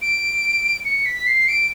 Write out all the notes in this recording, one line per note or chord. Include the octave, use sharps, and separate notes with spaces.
D7
C#7
B6
C7
D7